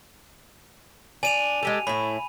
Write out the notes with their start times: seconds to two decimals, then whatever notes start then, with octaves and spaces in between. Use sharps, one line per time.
1.23 D4 G#5 D#7 F7
1.63 G#3 G4 A4
1.87 A2 E4 B5